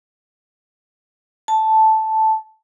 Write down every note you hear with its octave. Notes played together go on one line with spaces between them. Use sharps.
A5